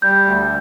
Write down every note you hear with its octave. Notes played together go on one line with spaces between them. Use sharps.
G3 G6
D2